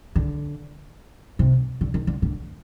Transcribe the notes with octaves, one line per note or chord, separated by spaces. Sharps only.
D3
C3
D3
D#3
D3
D3